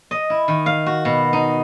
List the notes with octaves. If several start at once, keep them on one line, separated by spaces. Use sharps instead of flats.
D#5
E4
D#3
F5
F#4
B2
D#4